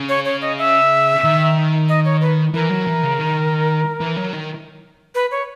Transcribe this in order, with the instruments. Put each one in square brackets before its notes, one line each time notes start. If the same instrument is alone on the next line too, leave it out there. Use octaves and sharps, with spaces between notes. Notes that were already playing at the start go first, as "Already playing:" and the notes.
Already playing: [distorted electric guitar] C#3
[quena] C#5
C#5
D#5
E5
[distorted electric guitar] D#3
[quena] D#5
C#5
B4
[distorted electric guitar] E3 [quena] A#4
[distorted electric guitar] F#3
E3
C#3
D#3
E3
F#3
D#3
[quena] B4
C#5